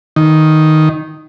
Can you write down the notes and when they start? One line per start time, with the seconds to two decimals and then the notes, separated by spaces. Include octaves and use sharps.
0.16 D#3